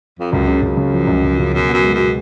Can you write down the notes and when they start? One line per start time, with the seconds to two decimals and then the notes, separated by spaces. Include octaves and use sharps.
0.19 F2
0.32 C#2 F#2
0.48 C#3
0.62 C#2 F#2
0.77 C#3
0.93 F3
1.07 C#2
1.24 C#2
1.39 C#3
1.54 F#2 B2
1.68 B3
1.73 F#2
1.84 G#3
1.94 F#2 B2